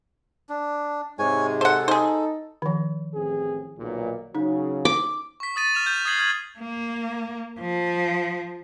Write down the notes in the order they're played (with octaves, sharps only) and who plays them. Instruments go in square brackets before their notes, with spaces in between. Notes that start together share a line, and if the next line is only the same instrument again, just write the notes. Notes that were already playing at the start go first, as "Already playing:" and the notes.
[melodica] D4
[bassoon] G#2 [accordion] C3 G#3 [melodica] C#5 G#5
[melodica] A4 [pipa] C5 F#5
[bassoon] D#4 [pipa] G#4 C5
[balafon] D#3 F3
[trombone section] A1 C4 G#4
B1 A#2
[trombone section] C#3 F#3 [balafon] D#4
[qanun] D6
[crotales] C#6 B6
D#6 A6 D#7
F6 E7 F7
G6
D#6 G#6 C7 F#7
D#6 F6 G#6 C7 F#7
[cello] A#3
F3